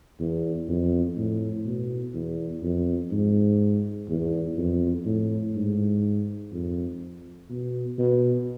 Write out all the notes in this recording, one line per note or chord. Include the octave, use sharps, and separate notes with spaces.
E2
F2
A2
B2
E2
F2
G#2
E2
F2
A2
G#2
F2
B2
B2